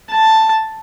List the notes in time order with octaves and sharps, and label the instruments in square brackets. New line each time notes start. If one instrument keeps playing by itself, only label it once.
[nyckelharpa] A5